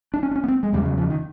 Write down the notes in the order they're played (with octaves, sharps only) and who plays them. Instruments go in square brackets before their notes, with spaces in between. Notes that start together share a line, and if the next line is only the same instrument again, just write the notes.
[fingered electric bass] D4
C#4
D4
C#4
B3
C4
G#3
E2 C#3 G3
F#3
F3
D#3